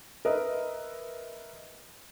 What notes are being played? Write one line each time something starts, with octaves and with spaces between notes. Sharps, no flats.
A#4 B4 D#5 E5